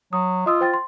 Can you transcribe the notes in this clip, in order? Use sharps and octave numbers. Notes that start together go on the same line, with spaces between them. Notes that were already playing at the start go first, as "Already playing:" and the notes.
F#3 D#6
F4 D#5 D#6 E6
C5 G5 A6
C6